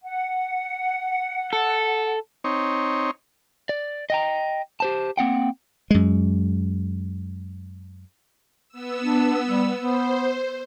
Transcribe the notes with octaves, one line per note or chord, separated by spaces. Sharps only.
F#5
A4
C4 D#4 C#5
D5
D#5 G5 A#5
G4 C5 A5
A#3 C4 F#5 G5
F#2 G#3
B3 E6
D4
G3
B3 C5